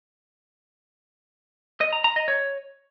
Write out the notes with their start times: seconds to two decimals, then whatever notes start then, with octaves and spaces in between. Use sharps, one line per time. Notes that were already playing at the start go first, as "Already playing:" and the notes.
1.81 D#5
1.93 A#5
2.04 A#5
2.16 D#5
2.28 C#5